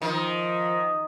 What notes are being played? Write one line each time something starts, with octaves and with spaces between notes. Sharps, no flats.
D#3 F3